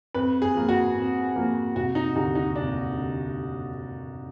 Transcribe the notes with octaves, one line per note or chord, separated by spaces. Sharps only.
F2 B4
G#4
F3 A#3
F#4
F2
F3 A#3
F1 F#4
D#4
D#2 D3 D#4
D#4
F1 D4
D3